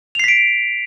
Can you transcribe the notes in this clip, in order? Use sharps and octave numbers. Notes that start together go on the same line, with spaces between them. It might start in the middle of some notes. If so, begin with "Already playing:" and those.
B6 C7 D7 F7